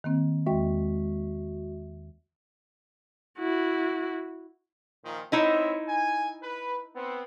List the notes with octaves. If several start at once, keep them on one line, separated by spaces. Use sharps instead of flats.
D#3 A#3 C4
E2 G#3 F#4 E5 G5
E4 F#4
A#2 D#3 F3
C4 D#4 E4 C#5 D#5 E5
G#5
B4
B3 C4